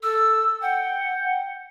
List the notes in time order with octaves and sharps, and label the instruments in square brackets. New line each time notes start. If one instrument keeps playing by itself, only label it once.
[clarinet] A4 [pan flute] E6
[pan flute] F#5 [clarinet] G5